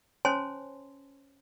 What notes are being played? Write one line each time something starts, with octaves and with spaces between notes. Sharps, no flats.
C#4 C5 C#5 G#5 A5 C6